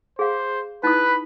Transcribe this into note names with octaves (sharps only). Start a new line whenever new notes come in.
G#4 C5 F5
D#4 E4 B4 B5 D#6